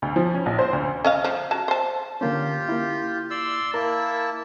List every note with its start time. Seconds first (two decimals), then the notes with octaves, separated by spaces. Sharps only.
0.02 D2
0.16 F3
0.35 C#4
0.46 A#1
0.59 C5
0.73 D2
1.05 C#4 D#5 F5
1.24 F3
1.51 F#3 A5
1.68 C5 A5
2.21 D3 A#3 C#4 F4 G4
2.69 A#3 E4
3.31 D5 C6 E6
3.74 A#3 E4 A#4 A5